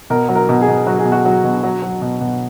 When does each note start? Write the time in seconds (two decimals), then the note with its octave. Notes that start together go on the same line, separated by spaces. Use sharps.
0.10 B2 A#4
0.29 F#3
0.35 A#4
0.49 B2
0.61 G#4
0.68 B2
0.87 F#3 F#4
0.99 G#4
1.05 B2
1.12 F#4
1.25 F#3
1.44 B2
1.63 F#3
1.83 F#3
2.02 B2
2.21 B2